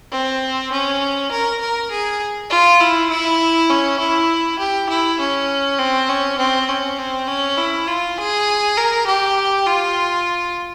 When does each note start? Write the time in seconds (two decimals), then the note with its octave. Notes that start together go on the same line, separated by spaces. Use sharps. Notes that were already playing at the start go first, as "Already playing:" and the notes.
0.11 C4
0.72 C#4
1.31 A#4
1.61 A#4
1.91 G#4
2.50 F4
2.80 E4
3.10 E4
3.70 C#4
4.00 E4
4.59 G4
4.89 E4
5.20 C#4
5.79 C4
6.09 C#4
6.38 C4
6.69 C#4
6.98 C4
7.28 C#4
7.58 E4
7.87 F4
8.18 G#4
8.77 A#4
9.07 G4
9.66 F4